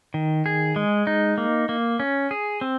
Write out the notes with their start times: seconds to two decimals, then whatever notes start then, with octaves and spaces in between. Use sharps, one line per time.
0.14 D#3
0.46 G#4
0.76 G#3
1.07 D#4
1.38 A#3
1.69 A#3
2.00 C#4
2.31 G#4
2.61 C4